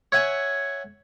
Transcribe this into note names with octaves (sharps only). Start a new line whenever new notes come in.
C#5 E5 F#5 G#5